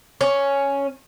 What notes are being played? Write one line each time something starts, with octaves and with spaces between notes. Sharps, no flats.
C#4